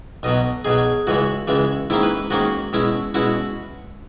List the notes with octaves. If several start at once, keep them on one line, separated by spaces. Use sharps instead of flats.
B1 B2 F#3 D#5
B1 B2 F#3 G#4
C#2 C#3 E3 G#3 F#4
C#2 C#3 E3 G#3
G#2 D#3 A#3 C#4 E4
B4
G#2 D#3 A#3 C#4 F#4
B2 G#3 C#4 E4
B2 G#3 C#4 E4 F#4